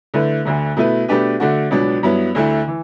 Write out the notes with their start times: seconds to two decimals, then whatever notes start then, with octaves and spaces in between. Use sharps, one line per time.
0.14 D3 A3 E4 B4
0.45 D2 D3 A3
0.77 B2 A3 E4 B4
1.08 B2 A3 D4 G4 B4
1.40 D3 A3 D4 F#4
1.71 C#2 B2 F#3 B3 D4
2.03 G2 F#3 B3 E4
2.35 D2 D3 A3 E4
2.68 E3